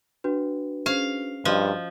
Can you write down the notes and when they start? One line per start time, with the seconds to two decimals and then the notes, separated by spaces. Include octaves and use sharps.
0.24 D4 F#4 B4
0.86 C#4 G#4 C5 F5
1.45 G2 F3 F#4 D#5